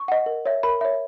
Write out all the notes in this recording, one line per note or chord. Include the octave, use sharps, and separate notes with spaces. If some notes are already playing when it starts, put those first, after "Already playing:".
Already playing: C#6
D#5 F#5
A#4
C#5 E5
A#4 B5
C#5 E5